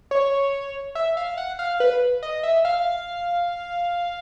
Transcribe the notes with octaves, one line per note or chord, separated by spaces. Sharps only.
C#5
E5
F5
F#5
F5
B4
D#5
E5
F5